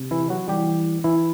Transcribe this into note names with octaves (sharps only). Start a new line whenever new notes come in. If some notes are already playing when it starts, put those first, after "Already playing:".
Already playing: C3
E3 E4
F#3 F#4
E3 G3 G4
E3 E4